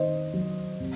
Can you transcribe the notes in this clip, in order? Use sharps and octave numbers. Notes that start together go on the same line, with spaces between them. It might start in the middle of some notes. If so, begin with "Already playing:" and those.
Already playing: D#3 C5 D#5
F#3
C3